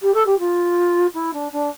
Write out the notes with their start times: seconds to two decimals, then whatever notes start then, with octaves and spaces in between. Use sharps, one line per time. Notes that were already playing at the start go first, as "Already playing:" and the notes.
0.02 G4
0.14 A4
0.26 G4
0.39 F4
1.14 E4
1.34 D4
1.52 D4